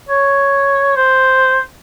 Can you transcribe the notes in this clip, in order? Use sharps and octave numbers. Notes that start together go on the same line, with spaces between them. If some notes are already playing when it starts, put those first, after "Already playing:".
C#5
C5